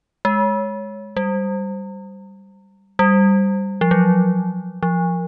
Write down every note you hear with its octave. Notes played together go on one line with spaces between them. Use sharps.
G#3
G3
G3
F3
F#3
F3